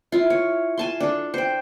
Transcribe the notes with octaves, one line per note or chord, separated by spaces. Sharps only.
E4 F4
C#5
G#5 A5 C6
D4 A4
C5 G5